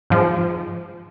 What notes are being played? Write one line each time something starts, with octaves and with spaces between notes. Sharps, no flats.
G#2 F3